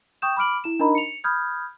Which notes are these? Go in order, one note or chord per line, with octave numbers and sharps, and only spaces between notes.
G5 C#6 D#6 G6 E7
B5 D6 F6 D7 F#7
E4 E7
D4 D#4 A#4 D#5 A#5 B5
C#7 F7
B5 D#6 F6 G6 G#6